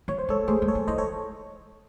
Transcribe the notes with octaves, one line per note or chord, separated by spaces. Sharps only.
F#3 C#5
C5
G#3 A4 C#5
A3 G#4 C5
G#3
A4 C#5
F#3
E3 C5 D#5
A4 C#5